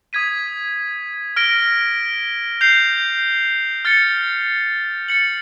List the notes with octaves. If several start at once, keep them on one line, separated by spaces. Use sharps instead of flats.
D#6 G#6 B6 D#7
F6 A#6 D7 G7
G6 C7 F7
F6 A6 C#7
A6 C#7 F#7